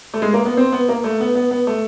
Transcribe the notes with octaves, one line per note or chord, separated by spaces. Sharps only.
A3
G#3
A#3
B3
C4
B3
A#3
A3
B3
B3
B3
A3